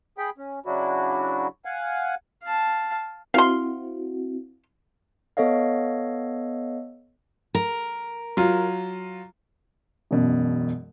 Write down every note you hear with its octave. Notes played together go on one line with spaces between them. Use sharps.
G#4 G5 B5
C#4
C#3 F#3 D4 E4 F#4
F5 F#5 G#5
F5 A5
C4 E4 F#4 F5 C6
B3 A4 C#5 D#5 F5
A#4
F#3 F4
E1 F#2 B2